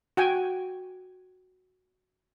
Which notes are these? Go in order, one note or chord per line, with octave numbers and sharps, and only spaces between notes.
F#4 G5 G#5